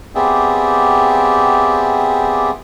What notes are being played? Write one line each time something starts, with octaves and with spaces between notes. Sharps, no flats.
B3 C4 G4 G#4 D5 E5